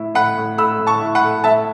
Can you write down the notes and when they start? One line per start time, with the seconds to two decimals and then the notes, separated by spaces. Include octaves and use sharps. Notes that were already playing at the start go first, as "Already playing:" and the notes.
Already playing: A2 E4
0.14 A2 F#5 B5
0.37 A2
0.57 A3 B5 E6
0.79 A2
0.87 A5 C#6
1.01 E4
1.15 F#5 B5
1.23 A3
1.44 A2 E5 A5